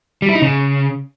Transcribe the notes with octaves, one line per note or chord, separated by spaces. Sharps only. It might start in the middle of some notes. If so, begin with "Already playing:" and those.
G3
E4
D#4
C#3